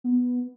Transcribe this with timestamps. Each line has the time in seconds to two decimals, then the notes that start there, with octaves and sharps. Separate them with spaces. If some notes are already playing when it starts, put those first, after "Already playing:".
0.04 B3